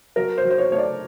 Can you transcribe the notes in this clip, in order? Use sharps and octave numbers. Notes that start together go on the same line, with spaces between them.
F#3 A#4
C5
F#3
C5
C#5
A3 C#5
D5